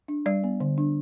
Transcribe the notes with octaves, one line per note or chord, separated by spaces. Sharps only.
D4
G3 D5
B3
D3
D4